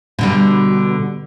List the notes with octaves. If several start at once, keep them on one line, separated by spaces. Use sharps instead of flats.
B2 D3 G3